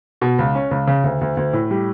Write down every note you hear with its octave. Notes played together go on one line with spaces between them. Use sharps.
B2
C#2
C#4
C#2
C#3
D2
D2
D2
A2
G3